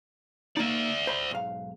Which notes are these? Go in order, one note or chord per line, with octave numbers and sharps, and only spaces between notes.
A#3 D#4 D5 E5
C5 B5
B1 G#2 F5